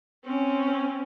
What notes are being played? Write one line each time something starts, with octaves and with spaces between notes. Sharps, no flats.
C4 C#4